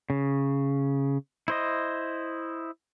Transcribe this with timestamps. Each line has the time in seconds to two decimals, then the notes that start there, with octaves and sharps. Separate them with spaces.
0.10 C#3
1.48 E4 C5 D#5